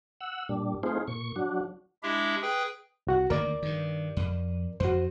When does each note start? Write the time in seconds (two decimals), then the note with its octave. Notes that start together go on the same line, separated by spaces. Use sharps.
0.21 F#5 E6
0.49 A#2 G3 D4
0.83 A3 C4 D#4 F4 G#4 C5
1.08 A#2 C#6
1.36 F#3 D4 F#4
2.03 G#3 D4 E4 G4 E5
2.42 G#4 B4 G5
3.07 C2 F#4 F#5
3.30 D2 D#3 A#3 A#4 D5
3.63 G2 D#3
4.17 F2
4.80 F2 F#4 C5